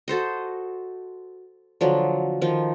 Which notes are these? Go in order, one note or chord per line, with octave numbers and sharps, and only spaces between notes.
F#4 A4 C5 D#5
D3 F3 F#3
D#3 F3